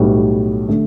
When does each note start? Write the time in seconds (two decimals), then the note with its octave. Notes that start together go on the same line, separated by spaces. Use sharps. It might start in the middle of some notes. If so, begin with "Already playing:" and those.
Already playing: B1 A2 G3 B3 F#4
0.69 D3 A3